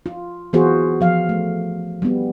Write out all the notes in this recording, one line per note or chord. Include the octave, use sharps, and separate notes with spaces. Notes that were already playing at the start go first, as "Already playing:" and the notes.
F4
E3 B3 F4 F#4 G#4 C5
F3 F5
A3
G3 B3